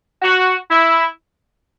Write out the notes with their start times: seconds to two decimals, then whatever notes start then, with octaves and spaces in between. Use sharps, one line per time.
0.22 F#4
0.69 E4